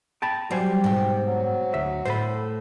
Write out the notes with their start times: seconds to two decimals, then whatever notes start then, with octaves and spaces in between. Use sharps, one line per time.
0.22 G5 A5 B5
0.51 F#3 G3 G4 C5 G#5
0.84 G#2 B2 C4
1.28 F#3
1.74 D2 E5
2.05 A2 E4 A4 C5 B5